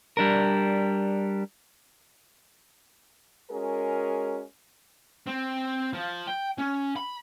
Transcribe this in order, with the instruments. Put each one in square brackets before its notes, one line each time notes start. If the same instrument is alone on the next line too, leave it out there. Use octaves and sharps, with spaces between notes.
[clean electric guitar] G3 D4 A#4
[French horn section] G#3 C#4 F#4 G#4 A#4
[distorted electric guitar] C4
F3
G5
C#4
B5